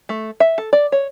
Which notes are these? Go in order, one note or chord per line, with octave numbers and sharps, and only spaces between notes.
A3
E5
A4
D5
C#5